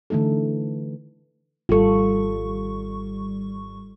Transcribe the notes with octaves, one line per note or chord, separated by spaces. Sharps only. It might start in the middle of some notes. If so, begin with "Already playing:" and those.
D3 E3 A3 D#4 A4
G#1 G3 F4 A4 C#6